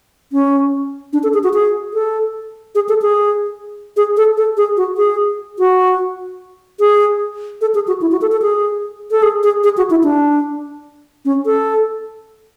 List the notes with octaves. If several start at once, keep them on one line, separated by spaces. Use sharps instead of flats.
C#4
D4
A4
G#4
F#4
G#4
A4
G#4
A4
G#4
G#4
A4
A4
G#4
F#4
G#4
F#4
G#4
A4
G#4
F#4
E4
F#4
A4
A4
G#4
A4
G#4
G#4
G#4
F#4
E4
D4
C#4
A4